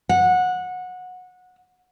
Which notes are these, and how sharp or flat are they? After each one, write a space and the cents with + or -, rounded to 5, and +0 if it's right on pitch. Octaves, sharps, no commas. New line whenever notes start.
F#5 -20